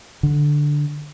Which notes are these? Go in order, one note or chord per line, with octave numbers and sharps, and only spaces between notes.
D3